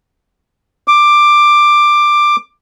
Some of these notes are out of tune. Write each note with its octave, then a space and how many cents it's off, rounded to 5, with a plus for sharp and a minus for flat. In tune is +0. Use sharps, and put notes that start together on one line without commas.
D6 +10